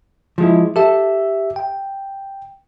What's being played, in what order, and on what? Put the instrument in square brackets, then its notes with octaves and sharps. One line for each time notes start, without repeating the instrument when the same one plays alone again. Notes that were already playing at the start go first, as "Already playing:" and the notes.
[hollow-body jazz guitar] F3 G#3 E4
[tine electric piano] G4 E5 [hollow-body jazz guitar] A4
[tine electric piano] G5